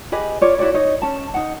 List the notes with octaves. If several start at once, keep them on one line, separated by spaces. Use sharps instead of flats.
G4 G#4 B4 D#5
F4 C#5 D5
E4 F#4 C#5 D5
D#4 C#5 D#5
C#4 A5
D#4 F#5